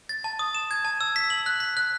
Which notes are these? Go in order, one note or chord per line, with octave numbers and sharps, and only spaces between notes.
A6
A5
D#6
E7
G#6
A5
E6
B6
F#7
F#6
B6
F#6